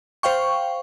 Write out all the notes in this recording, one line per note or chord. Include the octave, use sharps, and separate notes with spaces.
C5 F5 G5 C#6